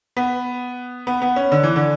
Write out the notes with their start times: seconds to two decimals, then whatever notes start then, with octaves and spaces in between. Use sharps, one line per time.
0.17 B3
1.07 B3
1.22 B3
1.36 C#4
1.52 D3
1.63 E3
1.76 D3